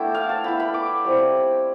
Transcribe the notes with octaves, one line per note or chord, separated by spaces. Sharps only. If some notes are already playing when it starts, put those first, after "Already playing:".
Already playing: A3 B3 D4 E4 G5 A5
F5
A5
B3 E4 B5
B5
D6
G3 C4 E4